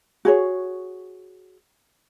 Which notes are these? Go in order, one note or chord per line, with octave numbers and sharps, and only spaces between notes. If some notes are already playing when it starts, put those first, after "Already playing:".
F#4 G#4 C#5